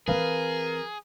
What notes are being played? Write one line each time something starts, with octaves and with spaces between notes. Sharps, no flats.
E3 C4 G#4 A#4 B4 F5